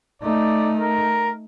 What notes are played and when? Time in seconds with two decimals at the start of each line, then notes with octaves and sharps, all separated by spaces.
0.22 A3 D#4 D5
0.79 A#4